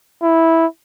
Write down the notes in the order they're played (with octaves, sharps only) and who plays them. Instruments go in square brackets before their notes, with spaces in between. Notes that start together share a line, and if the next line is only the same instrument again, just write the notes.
[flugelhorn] E4